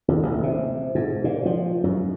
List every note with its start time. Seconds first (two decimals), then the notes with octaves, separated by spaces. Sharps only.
0.08 D#2
0.23 A1
0.43 C3
0.95 G#2
1.24 A#2
1.46 F3
1.84 F#2